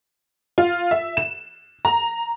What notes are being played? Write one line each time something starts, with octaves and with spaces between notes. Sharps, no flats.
F4
E5
E7
A#5